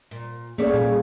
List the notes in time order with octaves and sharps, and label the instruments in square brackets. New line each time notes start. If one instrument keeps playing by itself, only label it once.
[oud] A#2
[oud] A3 D5 [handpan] A#3 C#4 C#5 [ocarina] G#4
[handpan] A#2 [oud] G3